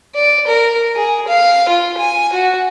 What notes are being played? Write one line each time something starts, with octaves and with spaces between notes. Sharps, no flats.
D5
A#4
G#4
F5
F4
G#5
F#4